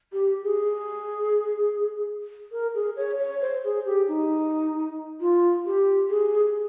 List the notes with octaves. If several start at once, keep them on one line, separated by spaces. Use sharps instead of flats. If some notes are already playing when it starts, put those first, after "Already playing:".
G4
G#4
A#4
G#4
C#5
C#5
C5
G#4
G4
D#4
F4
G4
G#4